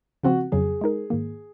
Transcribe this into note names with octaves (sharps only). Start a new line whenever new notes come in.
C#3 F3 C4 F4 F#4
F2 C#3 F#3 G#4
G#3 D#4 A#4
G#2 D#3 A#3